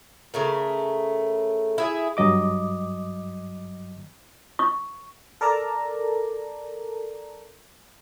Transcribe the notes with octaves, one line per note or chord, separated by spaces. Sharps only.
C#3 A3 A#4
E4 G#4
G2 F#3 D#5 D6
C#6
A4 A#4 D5 A5 A#5